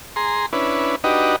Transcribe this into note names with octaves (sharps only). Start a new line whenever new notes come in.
G#4 A#5 C6
C#4 D4 E4 B4
D4 D#4 F#4 G4 B4 D#5